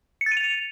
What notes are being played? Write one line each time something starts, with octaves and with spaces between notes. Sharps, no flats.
C#7
A6
D#7
F7